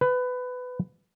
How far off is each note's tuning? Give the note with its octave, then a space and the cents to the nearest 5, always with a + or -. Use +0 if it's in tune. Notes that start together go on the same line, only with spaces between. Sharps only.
B4 +20